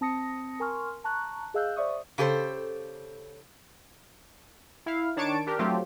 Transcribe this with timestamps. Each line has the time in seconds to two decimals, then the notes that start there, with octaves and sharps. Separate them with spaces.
0.01 C4 A5 D#6 A#6 C#7
0.60 A#4 G#5 C6 C#6 F6
1.04 A5 A#5 C#6 F#6
1.54 G#4 D#5 F5 E6 F#6 G6
1.76 C5 D5 E5 C#6 D#6
2.18 C#3 G4 A4 C5
4.86 E4 F5
5.16 D#3 D4 C#5 A5 C#6 D7
5.47 D4 G4 A#4
5.59 F#3 A3 C4 F4 G4